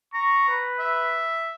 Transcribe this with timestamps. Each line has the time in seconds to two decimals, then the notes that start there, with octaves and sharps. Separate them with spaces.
0.14 A#5 C#6
0.48 B4
0.80 E5